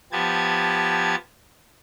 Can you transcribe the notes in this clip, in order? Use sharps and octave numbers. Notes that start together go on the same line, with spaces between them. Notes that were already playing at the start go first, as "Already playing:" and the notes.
F3 B3 G4 A5 G#6